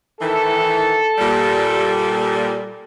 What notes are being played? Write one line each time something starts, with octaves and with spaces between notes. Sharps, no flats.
D#3 E3 A4
A#2 G3